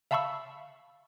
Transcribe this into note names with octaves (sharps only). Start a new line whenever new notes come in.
E5 F5 A5 B5 C#6 E6